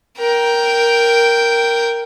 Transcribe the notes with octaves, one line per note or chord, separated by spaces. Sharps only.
A#4 G5